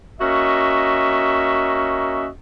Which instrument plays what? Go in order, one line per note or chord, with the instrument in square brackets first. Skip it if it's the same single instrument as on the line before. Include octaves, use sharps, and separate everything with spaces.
[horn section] A#3 C#4 F#4 D#5 E5